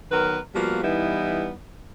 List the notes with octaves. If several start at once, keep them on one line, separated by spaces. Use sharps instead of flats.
D#3 F#3 B3 A#4 B4
F3 G3 A#3 B3 F#4
E3 G3 B3 D#4 E4